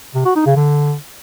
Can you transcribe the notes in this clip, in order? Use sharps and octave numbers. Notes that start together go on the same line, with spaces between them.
C3
F#4
D#4
C#3
D3